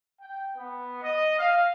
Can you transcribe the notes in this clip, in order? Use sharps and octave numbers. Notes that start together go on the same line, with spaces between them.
G5
B3
D#5
F5